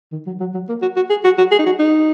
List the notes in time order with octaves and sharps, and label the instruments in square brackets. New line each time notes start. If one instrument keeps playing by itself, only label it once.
[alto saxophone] D#3
F#3
F#3
F#3
A#3
F#4
F#4
G#4
F#4
F#4
G#4
D#4
F#4
D#4